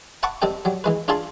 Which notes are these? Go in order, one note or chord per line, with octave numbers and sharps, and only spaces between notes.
E5 F#5 A5 B5 C#6 D6
C3 G3 C4 A4 D#5 G5
F#3 G3
E3 G#3 B4
D4 F4 G#4 E5 A5 C6